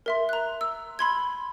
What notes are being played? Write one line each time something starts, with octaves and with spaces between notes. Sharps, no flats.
A#4 E5 C6
A#5 F#6
E6
B5 C6 G#6